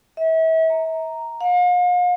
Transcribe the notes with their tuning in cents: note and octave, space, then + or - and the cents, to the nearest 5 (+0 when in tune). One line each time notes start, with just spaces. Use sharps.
E5 -35
A#5 -5
F5 +40